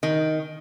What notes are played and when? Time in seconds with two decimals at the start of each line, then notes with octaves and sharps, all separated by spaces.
0.03 D#3